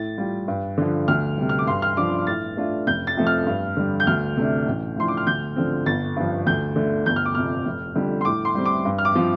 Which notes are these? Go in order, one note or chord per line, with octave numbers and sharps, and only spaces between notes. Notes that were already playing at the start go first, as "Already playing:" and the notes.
Already playing: A2 A6
G3 F4
G2
D3 F3
D2 F6
C3 G3
F6
D6
G2 C6
F6
F3 D4 F4 D6
A2 A6
A3 D4 F4
F1 G6
A6
F2 F3 A3
F6
G2
D3 G3
G6
D2 F6
C3 A3 D4
A1
A2 F3 D4 C6
D6
F6
D2 G6
D3 F3 C4
G1 A6
G2 F3
D2 G6
D3 A3
G1 G6
F6
D6
F2 C3 F6
F1
F2 D3 G3
C6
A2 D6
C6
G3 C4
D6
G2
F6
D6
F3 C4 F4